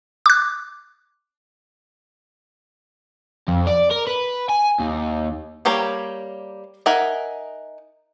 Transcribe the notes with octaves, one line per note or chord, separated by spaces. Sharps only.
D6 F#6
F2
D5
A#4
B4
G#5
D#2
G3 A#3 G4 C#5 A#5
D#4 A#4 E5 F#5 G#5